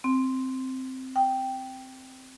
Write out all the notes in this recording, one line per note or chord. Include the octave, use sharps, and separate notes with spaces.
C4
G5